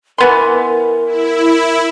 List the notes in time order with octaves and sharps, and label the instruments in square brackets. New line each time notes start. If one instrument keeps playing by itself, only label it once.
[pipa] E3 B3 C6 [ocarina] A#4
[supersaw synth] E4